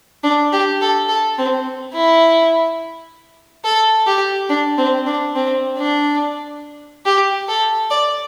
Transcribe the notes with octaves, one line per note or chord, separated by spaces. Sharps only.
D4
G4
A4
A4
C4
E4
A4
G4
D4
C4
D4
C4
D4
G4
A4
D5